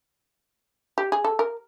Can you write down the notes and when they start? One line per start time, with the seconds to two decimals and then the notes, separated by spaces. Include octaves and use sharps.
0.98 G4
1.12 G#4
1.24 A4
1.39 A#4